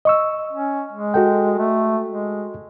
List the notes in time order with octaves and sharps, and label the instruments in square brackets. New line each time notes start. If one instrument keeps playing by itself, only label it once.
[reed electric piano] D#5 C#6 E6
[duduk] C#4
G#3
[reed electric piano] F#4 A4 G5
[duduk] A3
G#3